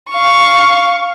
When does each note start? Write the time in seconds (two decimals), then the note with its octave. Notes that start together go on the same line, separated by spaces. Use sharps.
0.10 F5 C#6